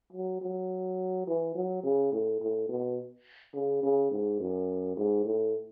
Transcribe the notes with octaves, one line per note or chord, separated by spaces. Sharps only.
F#3
F#3
E3
F#3
C#3
A2
A2
B2
C#3
C#3
G#2
F#2
G#2
A2